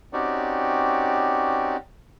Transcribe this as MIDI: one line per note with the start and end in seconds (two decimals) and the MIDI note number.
0.13 1.77 60
0.13 1.77 61
0.13 1.77 63
0.13 1.77 66
0.13 1.77 67
0.13 1.77 74